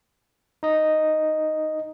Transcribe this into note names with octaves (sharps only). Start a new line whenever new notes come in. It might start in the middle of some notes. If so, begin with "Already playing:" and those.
D#4 D#5